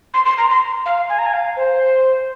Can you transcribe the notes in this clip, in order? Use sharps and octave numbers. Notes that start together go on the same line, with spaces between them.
C6
C6
A#5
C6
F5
G#5
A#5
G#5
F5
C5